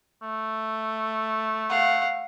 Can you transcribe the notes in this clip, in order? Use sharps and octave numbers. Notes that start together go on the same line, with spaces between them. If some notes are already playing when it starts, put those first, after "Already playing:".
A3
F5 F#5